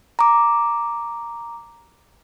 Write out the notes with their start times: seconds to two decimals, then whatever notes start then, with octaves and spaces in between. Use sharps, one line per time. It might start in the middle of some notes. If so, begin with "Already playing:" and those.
0.19 A#5 D6